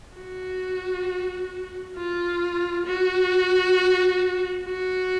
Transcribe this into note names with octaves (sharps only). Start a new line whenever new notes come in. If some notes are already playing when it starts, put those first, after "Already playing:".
F#4
F4
F#4
F#4